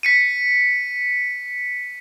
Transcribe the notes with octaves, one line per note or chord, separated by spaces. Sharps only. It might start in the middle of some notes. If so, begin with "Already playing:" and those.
B6 C#7 D#7